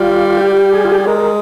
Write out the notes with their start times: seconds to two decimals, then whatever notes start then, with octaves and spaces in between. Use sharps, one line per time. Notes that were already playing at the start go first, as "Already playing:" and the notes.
Already playing: G3 F4
0.37 G4
0.72 G#4
0.84 F4
0.92 G4
1.00 G#4
1.07 G#3 A#4